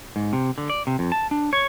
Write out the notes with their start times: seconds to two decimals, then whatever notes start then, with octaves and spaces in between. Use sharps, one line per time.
0.16 G#2
0.33 C3
0.58 D3
0.70 D5
0.87 C3
0.99 F2
1.12 A5
1.31 D4
1.53 C#5